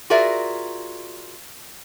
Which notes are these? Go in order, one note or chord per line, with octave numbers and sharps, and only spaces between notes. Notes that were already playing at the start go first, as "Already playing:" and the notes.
F4 F#4 G#4 A#4 D5 E5